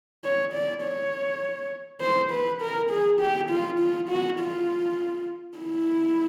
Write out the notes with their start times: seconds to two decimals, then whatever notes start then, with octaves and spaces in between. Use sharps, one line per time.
0.24 C#5
0.54 D5
0.83 C#5
2.01 C5
2.31 B4
2.61 A#4
2.90 G#4
3.21 G4
3.50 F4
3.80 F4
4.09 F#4
4.39 F4
5.57 E4